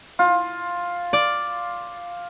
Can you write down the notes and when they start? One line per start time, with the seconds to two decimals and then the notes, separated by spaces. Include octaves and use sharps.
0.19 F4
1.13 D5